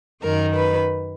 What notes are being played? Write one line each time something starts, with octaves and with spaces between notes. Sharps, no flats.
F#2 D#3 A#4
B4